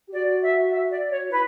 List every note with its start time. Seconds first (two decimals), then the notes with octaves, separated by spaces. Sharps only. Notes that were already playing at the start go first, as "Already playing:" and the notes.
0.08 G4
0.13 F#4 D5
0.42 E5
0.71 E5
0.90 D5
1.10 C#5
1.21 F#4
1.29 E4 B4